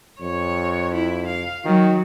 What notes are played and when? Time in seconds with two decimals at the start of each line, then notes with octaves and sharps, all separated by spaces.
0.21 F2 C#5
0.94 E4
1.27 F5
1.65 D#3 F#3